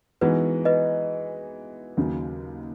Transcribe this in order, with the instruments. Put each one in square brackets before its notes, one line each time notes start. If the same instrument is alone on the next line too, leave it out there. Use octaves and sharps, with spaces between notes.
[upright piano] E3 G#3 B3 D#4 F#4 [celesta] B4
[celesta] B4 D#5
[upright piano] D#2 C#3 F#3